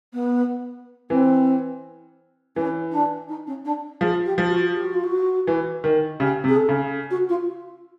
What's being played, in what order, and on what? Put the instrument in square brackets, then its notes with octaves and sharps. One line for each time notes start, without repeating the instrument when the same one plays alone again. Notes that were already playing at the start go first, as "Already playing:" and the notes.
[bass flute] B3
[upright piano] E3 [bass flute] C4
[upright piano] E3 [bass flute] C#4
[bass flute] D4
D#4
C#4
D4
[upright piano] F3 [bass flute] G#4
[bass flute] G4
[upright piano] F3
[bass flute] F#4
G4
F#4
F4
F#4
[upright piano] E3
D#3
[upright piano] C#3 [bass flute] G4
[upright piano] C3
[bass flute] G#4
A4
[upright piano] C#3
[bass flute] F#4
F4